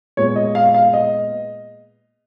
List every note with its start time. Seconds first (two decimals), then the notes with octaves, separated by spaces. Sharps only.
0.17 A#2 G#3 B3 C#5
0.36 D#5
0.55 F5
0.74 F5
0.93 D#5